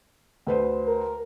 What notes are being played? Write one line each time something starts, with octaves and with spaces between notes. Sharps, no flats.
D2 B4 C5
A#4